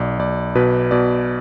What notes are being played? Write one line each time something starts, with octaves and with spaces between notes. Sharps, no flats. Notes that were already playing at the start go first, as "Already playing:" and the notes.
Already playing: B1 D5
B1 D5
B2 B4
B2 D5